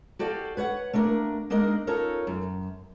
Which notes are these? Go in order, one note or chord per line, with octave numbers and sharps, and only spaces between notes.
F#4 G4 A4 D5 F5
B4 C#5 E5 F#5
A3 A#3 D4 A#4
G#3 A#3 D4 D#4 A#4 D#5
C#4 D#4 F4 A4 A#4 C#5
F#2